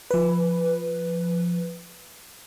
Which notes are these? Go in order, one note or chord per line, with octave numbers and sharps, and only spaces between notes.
F3 B4